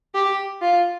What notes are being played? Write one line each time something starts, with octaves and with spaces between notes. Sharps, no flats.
G4
F4